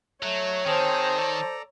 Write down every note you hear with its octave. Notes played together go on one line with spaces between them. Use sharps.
F#3 A3 C#5
D#3 C4 G#4 C5 A5 A#5
A4 D5 A#5